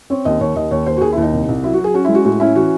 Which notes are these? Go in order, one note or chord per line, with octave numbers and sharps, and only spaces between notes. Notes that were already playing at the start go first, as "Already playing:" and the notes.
C4 C#5
D#2 D#5
D#2 C#5
D#2 D#5
D#2 C#5
D#2 C5
F#4
D#2 G#4
E4
D#2 D#4
C2
C2
F#3 E4
F#4
F#3
G#4
C#4 F#4
E4
G#3
F#4
A2 F#4
C#4 E4
E3 F#4